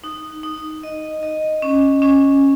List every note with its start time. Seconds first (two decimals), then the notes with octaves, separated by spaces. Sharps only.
0.04 D#4
0.43 D#4
0.83 D#5
1.23 D#5
1.62 C#4
2.02 C#4